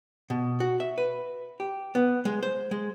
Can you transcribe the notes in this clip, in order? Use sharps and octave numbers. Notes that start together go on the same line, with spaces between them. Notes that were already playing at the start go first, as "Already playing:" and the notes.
B2
F#4
E5
B4
G4
B3
G#3
C5
G#3